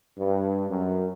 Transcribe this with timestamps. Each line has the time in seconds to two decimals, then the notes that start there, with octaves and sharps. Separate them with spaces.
0.17 G2
0.69 F#2